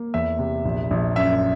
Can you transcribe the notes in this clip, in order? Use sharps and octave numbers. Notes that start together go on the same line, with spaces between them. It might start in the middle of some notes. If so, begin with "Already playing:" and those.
Already playing: A#3
E2 E5
C3
A#1
A#1
F#2 E5